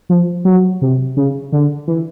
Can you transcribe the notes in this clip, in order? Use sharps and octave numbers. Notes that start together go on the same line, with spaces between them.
F3
F#3
C3
C#3
D3
E3